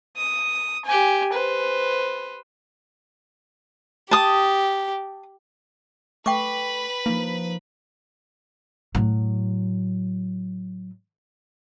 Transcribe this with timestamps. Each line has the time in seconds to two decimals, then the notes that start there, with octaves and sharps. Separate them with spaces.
0.17 D#6
0.85 G4 G#5
1.33 B4 C5
4.11 G4 A5 D#6
6.26 A3 B4 G5 B5 C#6 D6
7.06 F3 A#3 D#4
8.95 A2 F#3